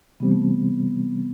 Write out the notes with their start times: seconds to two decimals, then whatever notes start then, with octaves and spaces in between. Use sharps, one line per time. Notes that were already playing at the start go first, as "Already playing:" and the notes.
0.20 C3 E3 G3 B3 C4
0.31 A3
0.42 B3